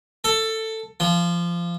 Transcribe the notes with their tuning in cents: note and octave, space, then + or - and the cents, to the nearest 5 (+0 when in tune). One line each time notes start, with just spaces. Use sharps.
A4 +15
F3 -20